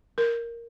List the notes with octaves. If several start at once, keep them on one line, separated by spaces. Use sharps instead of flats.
A#4